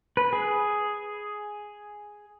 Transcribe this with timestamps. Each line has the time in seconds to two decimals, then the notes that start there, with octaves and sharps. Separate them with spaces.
0.17 B4
0.33 G#4